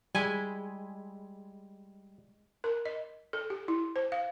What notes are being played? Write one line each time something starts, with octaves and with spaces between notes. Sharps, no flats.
G3 G#3 E4 G#5
A#4
D#5
A4
G4
E4
C5
F5